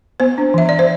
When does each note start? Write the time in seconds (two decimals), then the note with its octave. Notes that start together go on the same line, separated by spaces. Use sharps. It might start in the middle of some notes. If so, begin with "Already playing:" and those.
0.20 B3 C5
0.38 D4
0.54 E3 E5
0.69 E3 D5
0.79 C5